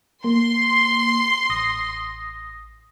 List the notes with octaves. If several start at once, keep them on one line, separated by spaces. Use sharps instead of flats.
A#3 C6
A1 D#6 A#6